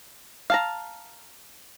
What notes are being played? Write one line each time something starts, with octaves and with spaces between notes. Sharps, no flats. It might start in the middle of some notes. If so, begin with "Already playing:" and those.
F5 A5 A#5